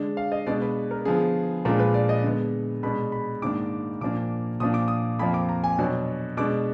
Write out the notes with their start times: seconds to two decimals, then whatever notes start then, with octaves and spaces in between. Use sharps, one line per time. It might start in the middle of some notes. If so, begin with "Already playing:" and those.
Already playing: D3 G#3 D4
0.17 F5
0.32 D#5
0.47 B2 G#3 B3 D4 D5
0.62 B4
0.91 A#4
1.05 D3 F3 B3 G#4
1.65 A#2 F3 G#3 D4 A#4
1.79 B4
1.94 D5
2.09 D#5
2.24 D3 G#3 B3
2.83 B2 G#3 D4 B5
3.12 B5
3.42 G#2 D#3 A#3 D4 D6
4.01 A#2 F3 A#3 D4 D6
4.60 A#2 F3 A#3 D4 D#6
4.74 D6
4.88 D#6
5.19 F2 F3 A#3 B5
5.34 D6
5.49 A#5
5.64 G#5
5.79 B2 F#3 D4
6.37 B2 G#3 D4 D6